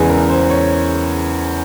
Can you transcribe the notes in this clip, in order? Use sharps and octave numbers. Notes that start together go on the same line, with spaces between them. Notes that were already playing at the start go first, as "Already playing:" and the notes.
Already playing: E2 C#3 E3 G#3 G#5
A#4
C5
C#5